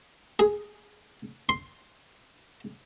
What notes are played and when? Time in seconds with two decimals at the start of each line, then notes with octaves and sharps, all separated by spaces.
0.39 G#4
1.49 C6